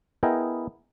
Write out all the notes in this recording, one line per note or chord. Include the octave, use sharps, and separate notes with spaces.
B3 E4 G#4 A#4 D#5 G5